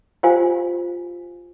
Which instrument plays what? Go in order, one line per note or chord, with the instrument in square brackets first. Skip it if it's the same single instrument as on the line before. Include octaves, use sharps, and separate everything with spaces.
[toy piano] F4 G4 C5 F5 G#5